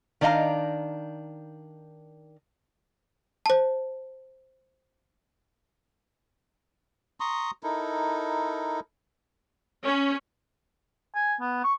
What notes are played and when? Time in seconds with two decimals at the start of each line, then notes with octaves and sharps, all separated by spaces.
0.21 D#3 D4 D#5 F5 A#5
3.46 C5 A5
7.20 A#5 C6 C#6 D#6
7.63 D#4 E4 A4 A#4
9.84 C#4
11.15 G#5
11.41 B3
11.64 C#6